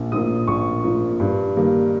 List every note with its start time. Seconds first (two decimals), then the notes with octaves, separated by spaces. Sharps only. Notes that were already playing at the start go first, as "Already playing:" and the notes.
Already playing: A#1
0.12 A#2 F3 A#3 D#6
0.47 A#1 C#6
0.84 A#2 F3 A#3
1.20 G2
1.57 D#3 G3 A#3